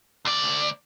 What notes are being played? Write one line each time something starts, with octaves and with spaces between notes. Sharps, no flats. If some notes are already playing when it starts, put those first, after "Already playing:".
D2 D5